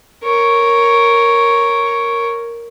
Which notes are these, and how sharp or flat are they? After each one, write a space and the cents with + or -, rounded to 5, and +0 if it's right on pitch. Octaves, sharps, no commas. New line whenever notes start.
A#4 +0 C#5 +0